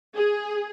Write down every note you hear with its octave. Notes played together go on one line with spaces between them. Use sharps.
G#4